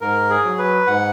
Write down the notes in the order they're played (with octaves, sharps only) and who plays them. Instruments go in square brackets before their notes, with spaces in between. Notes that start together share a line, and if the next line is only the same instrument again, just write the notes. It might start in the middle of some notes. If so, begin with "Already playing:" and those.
[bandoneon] G#2 A#4
G#4
F#3
B4
G#2 F#5